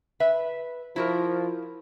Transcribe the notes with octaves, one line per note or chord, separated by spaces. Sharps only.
B4 E5
F3 E4 F#4 A#4